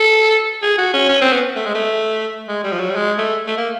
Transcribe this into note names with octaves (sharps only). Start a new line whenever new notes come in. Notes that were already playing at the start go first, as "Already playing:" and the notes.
Already playing: A4
G#4
F#4
C#4
C#4
C4
B3
A3
G#3
A3
G#3
G3
F3
F#3
G3
G#3
A3
A3
A#3